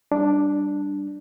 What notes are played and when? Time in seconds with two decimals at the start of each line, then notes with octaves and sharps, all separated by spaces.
0.12 G3 D4